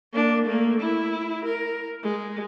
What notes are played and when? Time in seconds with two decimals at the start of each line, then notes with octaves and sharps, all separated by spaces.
0.13 A#3 D4
0.46 A3 A#3
0.80 E4
1.45 A#4
2.03 G#3